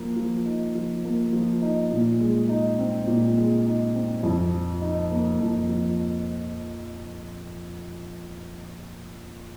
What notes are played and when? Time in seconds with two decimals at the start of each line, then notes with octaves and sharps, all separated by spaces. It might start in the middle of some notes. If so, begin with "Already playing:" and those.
Already playing: F3 A#3
0.16 F3
0.45 D#4
0.75 F3
1.04 A#3
1.32 F3
1.62 D#4
1.91 A#2
2.20 G#3
2.49 D#4
2.78 C4
3.07 A#2
3.37 G#3
3.66 D#4
3.94 C4
4.23 F2
4.53 F3
4.81 D#4
5.10 A#3
5.40 F2
5.69 F3